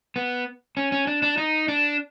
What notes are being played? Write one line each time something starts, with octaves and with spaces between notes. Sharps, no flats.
B3
C#4
C#4
D4
D4
D#4
D4